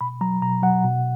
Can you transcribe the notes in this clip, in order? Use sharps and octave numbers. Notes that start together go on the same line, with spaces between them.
B2 B5
F#3 A#5
B2 A#5
F#3 F#5
B2